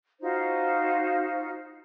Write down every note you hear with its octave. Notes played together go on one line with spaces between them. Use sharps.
D#4 F4 F#4 C5